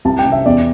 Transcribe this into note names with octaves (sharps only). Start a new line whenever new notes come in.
C2 A5
G5
C3
E5
E2 D5